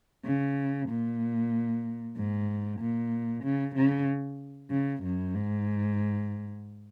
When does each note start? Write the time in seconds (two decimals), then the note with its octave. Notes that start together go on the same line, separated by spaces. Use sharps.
0.25 C#3
0.88 A#2
2.16 G#2
2.80 A#2
3.44 C#3
3.75 C#3
4.71 C#3
5.03 F#2
5.34 G#2